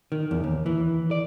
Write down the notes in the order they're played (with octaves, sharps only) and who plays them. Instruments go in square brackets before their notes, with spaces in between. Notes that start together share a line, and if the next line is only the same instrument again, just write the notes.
[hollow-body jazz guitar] D#3
E2
D#2
E3
D5